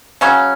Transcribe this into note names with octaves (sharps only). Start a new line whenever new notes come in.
C#3 F#3 C#4